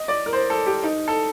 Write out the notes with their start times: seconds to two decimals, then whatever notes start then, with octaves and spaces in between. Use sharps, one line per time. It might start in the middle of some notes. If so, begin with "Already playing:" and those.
Already playing: D#5
0.08 D5
0.26 A#4
0.33 C5
0.50 A4
0.66 G4
0.84 D#4
1.08 A4